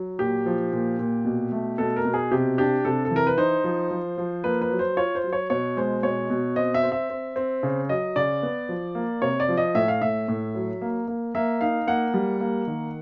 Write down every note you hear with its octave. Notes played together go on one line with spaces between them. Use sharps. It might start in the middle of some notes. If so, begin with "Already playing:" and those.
Already playing: F#3
A#2 G4
F3
A#2
A#2
B2
A3
B2 A4
A#4
B2
G#4
C3 G4
D4 G4
C3 A4
A4
E3
A#4
B4
D#4 C5
F3
F3
F3
A#3 B4
B4
F#3
C5
F4 C#5
C5
F#3
C#5
B2 C#5
G#3 C5
B2 C#5
B2
C4 D#5
E5
C4
E5
C4
C4
C#3
F#3 D#5
C#3 D5
B3
F3
A#3
C3 C#5
D5
F3
D#5
A2 E5
F5
A2 E5
A2
F#3
A#3
A#3
A#3 E5
D#4 F5
A#3 F#5
G3
A#3
D#3